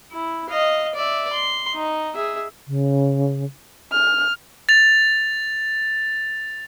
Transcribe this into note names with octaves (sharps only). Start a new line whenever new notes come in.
E4
D#5 F5
D5 E5
C6
D#4
G#4 E5
C#3
F6
A6 F7